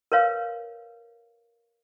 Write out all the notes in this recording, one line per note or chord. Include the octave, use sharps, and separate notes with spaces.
A#4 B4 C#5 F5